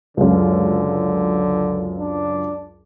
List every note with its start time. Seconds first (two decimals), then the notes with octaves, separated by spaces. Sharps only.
0.17 C#2 F#2 D3
1.99 D4